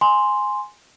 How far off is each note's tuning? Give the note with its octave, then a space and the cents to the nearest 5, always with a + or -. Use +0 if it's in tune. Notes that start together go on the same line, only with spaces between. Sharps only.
G#5 +0 C6 +0